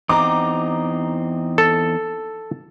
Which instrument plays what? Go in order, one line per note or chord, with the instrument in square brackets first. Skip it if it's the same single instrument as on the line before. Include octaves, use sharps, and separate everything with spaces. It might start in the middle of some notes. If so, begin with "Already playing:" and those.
[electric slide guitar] E2 C4 D#4 [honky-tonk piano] A#5 D6
[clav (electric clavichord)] A4